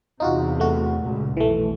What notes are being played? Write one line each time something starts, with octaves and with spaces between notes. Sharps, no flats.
E2 C3 D#4 F4 F#4
A3 F#4
C#2 A#2
B1 F2 E3 A3